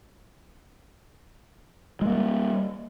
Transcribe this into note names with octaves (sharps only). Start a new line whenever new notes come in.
G3 G#3 A#3